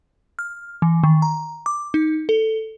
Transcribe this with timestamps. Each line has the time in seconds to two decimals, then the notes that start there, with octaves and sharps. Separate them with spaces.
0.39 F6
0.82 E3
1.04 D#3
1.22 A#5
1.66 D6
1.94 D#4
2.29 A4